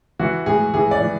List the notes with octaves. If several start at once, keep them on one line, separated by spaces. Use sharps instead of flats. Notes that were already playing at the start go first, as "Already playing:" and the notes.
E3 F#4
A2 G#4
E3 G#4
D5
E3